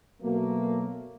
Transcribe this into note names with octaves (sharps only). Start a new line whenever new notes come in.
B2 F#3 A3 A#3